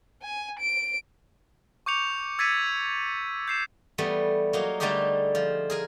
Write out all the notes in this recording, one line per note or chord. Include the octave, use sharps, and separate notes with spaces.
G#5
D7
C#6 D6 G6 C#7 F7
E6 G#6 A6 B6 C#7 D#7
G6 C7 E7
E3 G3 A3 B3
F#3 A#3 D#4
D3 G3 A3 D#4 G4 G#4
F3
G#4 A#4 G#5